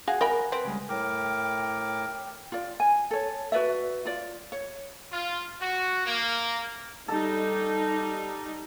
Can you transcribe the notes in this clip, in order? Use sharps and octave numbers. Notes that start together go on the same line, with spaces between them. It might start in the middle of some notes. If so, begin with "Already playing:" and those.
F#4 G#4 F5 F#5 G#5
A#4 D#5 G5 B5
C4 B4
C#3 G3 G#3
A2 A#4 G5 D6
F4 D5
G#5
A4 C#5
F#4 B4 D5 E5
F4 D5
C#5
F4
F#4
A#3
G3 D#4 A4